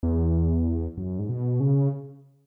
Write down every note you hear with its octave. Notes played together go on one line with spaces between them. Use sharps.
E2
F#2
G#2
B2
C#3